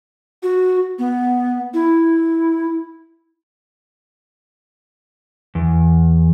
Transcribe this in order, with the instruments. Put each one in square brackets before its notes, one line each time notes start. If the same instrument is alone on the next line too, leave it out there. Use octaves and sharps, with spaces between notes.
[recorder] F#4
B3
E4
[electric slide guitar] E2